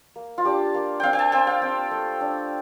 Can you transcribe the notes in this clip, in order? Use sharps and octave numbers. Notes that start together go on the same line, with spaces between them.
A#3
F4
D4 G4
A#3
C4 F5 G5
G5
A5
C4 G5
F5
C4
A3
D4